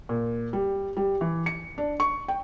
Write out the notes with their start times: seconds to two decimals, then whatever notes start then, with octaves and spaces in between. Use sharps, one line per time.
0.09 A#2
0.53 G3
0.97 G3
1.21 E3
1.46 C#7
1.78 D4
2.00 C#6
2.28 G5